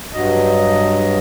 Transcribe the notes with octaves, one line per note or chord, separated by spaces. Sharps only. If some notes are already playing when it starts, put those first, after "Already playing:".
G2 F#3 D#5